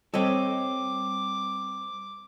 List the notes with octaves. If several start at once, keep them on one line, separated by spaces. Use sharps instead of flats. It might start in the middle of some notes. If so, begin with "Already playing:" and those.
G3 C4 A4 C#5 D#5 D6